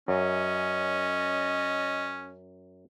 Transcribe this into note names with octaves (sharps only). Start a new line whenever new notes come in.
F#2 C#4 D#5